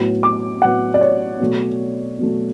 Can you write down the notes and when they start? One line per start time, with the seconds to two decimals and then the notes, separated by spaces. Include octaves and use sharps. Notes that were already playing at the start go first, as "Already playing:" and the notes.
Already playing: A2 F#3 B3
0.23 D6
0.62 A2 F#3 B3 F#5
0.94 D5
1.01 C#5
1.40 B2 F#3 A3
2.19 B2 F#3 A3